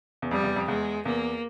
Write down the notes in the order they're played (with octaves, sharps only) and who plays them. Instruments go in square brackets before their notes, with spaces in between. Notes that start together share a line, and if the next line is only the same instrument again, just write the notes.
[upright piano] E2
[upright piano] F2 [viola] G3
[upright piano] E2
F2
[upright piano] E2 [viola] G#3
[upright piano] E2 [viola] A#3